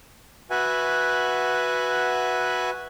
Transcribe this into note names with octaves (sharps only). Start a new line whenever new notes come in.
F#4 B4 E5 F#5 G#5